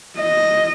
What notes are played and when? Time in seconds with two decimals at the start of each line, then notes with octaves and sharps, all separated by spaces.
0.18 D#5